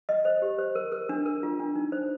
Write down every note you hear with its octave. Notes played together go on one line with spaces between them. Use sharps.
D#5
C5
G4
C5
A#4
A#4
D4
A#4
F4
D4
D#4
C5